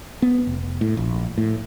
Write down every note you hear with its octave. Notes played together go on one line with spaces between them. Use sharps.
B3
F1
A2
A#1
A2